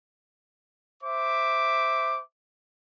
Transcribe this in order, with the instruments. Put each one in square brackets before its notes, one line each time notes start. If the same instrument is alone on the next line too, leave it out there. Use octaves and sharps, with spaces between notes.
[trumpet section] C5 E5 D6